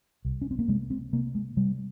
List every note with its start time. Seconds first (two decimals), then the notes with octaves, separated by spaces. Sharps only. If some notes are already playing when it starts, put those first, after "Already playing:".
0.25 C2
0.42 C#4
0.51 C4
0.59 A#3
0.68 C3 G#3
0.90 C4
1.13 C3 A#3
1.35 G#3
1.57 C3 G3